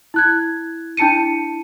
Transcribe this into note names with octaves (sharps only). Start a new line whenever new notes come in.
E4 F#6 G#6
D4 E4 A5 C#7 D#7